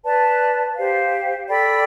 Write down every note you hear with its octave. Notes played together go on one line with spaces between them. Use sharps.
B4 D5 A5
G4 C5 F5
A4 D5 G5 B5